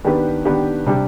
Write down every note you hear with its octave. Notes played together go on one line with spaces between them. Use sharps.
D#3 B3 D4 G4 B4
D#3 B3 D4 G4 B4
C3 G3 D4 G4